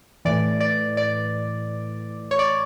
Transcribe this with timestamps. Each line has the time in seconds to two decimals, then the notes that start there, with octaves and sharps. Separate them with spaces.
0.25 A2 E3 D5
0.61 D5
0.97 D5
2.31 C#5
2.39 D5